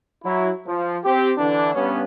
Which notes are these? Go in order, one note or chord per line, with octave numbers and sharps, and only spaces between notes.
F#3 E4
F3
C4 G4
D3 E3 D4
G2 B3 C#4